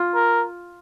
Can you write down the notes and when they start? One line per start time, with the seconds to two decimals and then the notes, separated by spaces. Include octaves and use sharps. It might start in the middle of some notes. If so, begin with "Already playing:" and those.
Already playing: F4
0.15 A#4